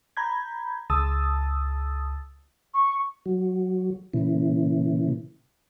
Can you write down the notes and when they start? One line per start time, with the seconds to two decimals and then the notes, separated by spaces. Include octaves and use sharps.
0.17 A#5 B5 G6 G#6
0.90 C#2 A5 D#6 E6 A6
2.74 C#6
3.26 F#3
4.13 A#2 C#3 E3